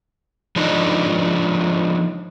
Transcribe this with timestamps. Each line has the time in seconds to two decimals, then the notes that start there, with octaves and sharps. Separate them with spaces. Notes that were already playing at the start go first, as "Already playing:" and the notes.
0.56 F3 G#3 D4 D#4